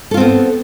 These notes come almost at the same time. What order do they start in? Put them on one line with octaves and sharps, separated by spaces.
A4 F4 C4 B3